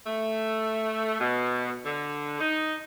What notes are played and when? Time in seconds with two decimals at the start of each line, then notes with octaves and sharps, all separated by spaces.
0.06 A3
1.20 B2
1.85 D3
2.40 D#4